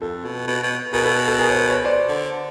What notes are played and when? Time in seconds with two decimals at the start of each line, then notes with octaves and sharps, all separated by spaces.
0.01 F2 A4
0.25 B2
0.47 B2
0.63 B2
0.93 B2 G#4 A#4
1.04 A4 B4
1.28 A4
1.39 G#4 A#4
1.49 C#5
1.54 A#4 C5
1.70 B4 C#5
1.85 C5 D5
2.08 D3